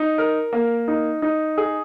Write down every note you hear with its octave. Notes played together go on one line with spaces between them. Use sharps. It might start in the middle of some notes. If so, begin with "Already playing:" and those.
Already playing: D#4
A#4
A#3
D#4
D#4
G#4